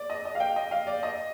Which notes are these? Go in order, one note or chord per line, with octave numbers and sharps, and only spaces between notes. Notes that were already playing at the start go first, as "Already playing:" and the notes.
Already playing: D5
D#5
D#5
F5
G5
D#5
F5
D5
D#5